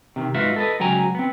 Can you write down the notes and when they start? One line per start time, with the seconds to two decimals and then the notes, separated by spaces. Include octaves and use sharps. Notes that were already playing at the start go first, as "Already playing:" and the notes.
0.16 C3 D#3
0.35 G#2 F4 F#4 B4 E5
0.56 A4 B4 D#5
0.80 C#2 F#3 G5 G#5 A#5
1.15 B3 C4